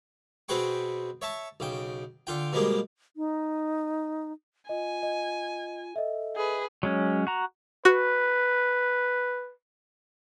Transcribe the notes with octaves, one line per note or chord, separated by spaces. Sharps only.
B2 C4 G#4 B4 G5 C#6
C#5 E5 A5 C#6
B1 C#3 G5
D3 F4 G5
B2 F3 G3 G#3 A#3
D#4
F4 D#5 G#5
D#5
A4 D#5 E5
G#4 B4
F#3 G#3 C#4
F#4 A#5
F#4 B4